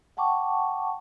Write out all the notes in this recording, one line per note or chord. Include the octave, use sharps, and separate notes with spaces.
F#5 G5 A5 C#6 D6